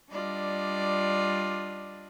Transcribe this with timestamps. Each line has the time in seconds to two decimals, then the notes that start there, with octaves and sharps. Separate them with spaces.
0.12 G3 D4 F4 D5 D#5